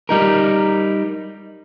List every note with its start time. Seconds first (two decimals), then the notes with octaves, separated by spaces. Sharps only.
0.09 G3 D#4 A#4